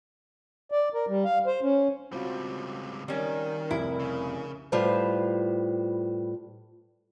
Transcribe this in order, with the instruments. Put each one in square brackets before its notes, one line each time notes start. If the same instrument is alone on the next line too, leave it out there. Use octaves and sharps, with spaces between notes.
[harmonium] D5
A#4
G3
F5
C5
C#4
[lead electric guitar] C#2 G3 [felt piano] C4 F4 F#4
[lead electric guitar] D#3 [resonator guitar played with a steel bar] G3 C#4 [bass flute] A#4
[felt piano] F1 C2 C3 [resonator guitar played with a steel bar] E4
[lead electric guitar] C#3
[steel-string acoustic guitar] A2 G3 F4 B4 C5